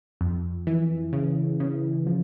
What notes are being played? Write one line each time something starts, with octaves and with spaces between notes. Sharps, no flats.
F2
E3
C#3
C#3
F3